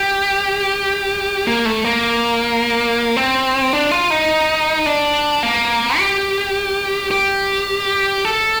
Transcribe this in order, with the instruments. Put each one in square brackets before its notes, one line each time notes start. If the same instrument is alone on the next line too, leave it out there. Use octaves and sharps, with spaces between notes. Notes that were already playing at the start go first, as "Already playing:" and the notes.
Already playing: [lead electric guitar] G4
A#3
A3
A#3
C4
D4
F4
D#4
D4
A#3
G4
G4
A4